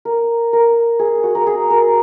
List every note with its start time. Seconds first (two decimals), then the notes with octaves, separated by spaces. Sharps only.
0.05 A#4
0.53 A#4
0.99 G#4
1.23 F#4
1.35 A#4
1.47 G#4
1.70 A#4